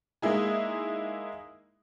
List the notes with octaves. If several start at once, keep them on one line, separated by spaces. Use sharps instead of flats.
G#3 A#3 D#4 E4 G#4